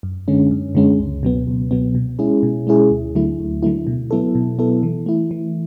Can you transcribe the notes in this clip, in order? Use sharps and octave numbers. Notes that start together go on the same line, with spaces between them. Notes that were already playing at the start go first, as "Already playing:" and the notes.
F#2
D3 G#3 C#4
F#2
D3 G#3 C#4
C#2
B2 F#3 B3
C#2
B2 F#3 B3
B2
G#3 C#4 E4 G#4
B2
G#3 C#4 E4 G#4
D2
D3 F#3 A3 E4
D2
D3 F#3 A3 E4
B2
F#3 B3 E4 A4
B2
F#3 B3 E4 A4
E3
A3 E4
E3